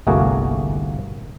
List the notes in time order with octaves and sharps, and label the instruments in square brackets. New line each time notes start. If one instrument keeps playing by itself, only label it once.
[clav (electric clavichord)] G1 C2 A3 A#3 F#4 G#4